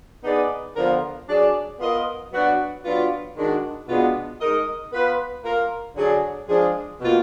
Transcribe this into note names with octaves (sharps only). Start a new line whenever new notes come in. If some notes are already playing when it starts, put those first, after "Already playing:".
B3 D#4 G#4 B4 D5
D3 F3 B3 F4 A#4
F#3 D4 G#4 D5
B3 F4 A#4 D#5
F#3 B3 D4 F#4
F#3 B3 D4 F4
D#3 G#3 D4 F#4
B2 G#3 B3 D4 F4
G#3 D#4 A#4 D#5
B3 F4 B4
A#3 F4 A#4
D3 F#3 D4 G#4
F3 G#3 D4 G#4
B2 A#3 F4